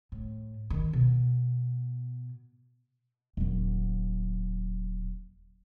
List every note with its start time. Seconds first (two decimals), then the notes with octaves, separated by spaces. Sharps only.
0.12 A2
0.70 D#3
0.93 B2
3.37 D#1 F#3